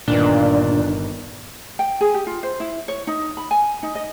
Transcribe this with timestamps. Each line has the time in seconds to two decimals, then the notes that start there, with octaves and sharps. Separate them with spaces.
0.08 G1 A#2 D#3 D4 G7
1.79 G5
2.01 G#4
2.14 G4
2.27 F4
2.43 C5
2.60 E4
2.88 C#5
3.07 D#4
3.37 B5
3.51 G#5
3.83 D#4
3.95 D#5